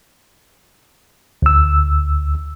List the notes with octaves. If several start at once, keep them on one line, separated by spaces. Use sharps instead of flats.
D2 E6